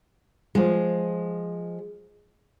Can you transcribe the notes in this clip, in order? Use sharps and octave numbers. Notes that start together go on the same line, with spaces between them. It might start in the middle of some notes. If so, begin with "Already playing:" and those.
F3 G#3